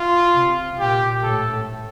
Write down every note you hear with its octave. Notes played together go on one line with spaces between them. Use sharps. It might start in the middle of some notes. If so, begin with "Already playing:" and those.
Already playing: F4
C3
A#2 G4
A2 A4